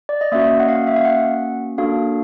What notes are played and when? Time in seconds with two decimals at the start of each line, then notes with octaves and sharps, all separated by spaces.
0.09 D5
0.21 D#5
0.32 A#3 C#4 F#4 E5
0.60 F#5
0.68 F5
0.87 E5
0.96 F5
1.05 F#5
1.78 A#3 D4 F#4 A4 F5